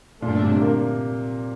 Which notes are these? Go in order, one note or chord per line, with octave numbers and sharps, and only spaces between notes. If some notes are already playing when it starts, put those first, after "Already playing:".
G2 A#2 D3 A3 D4
C3
A#3